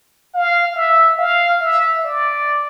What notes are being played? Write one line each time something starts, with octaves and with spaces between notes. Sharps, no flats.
F5
E5
F5
E5
D5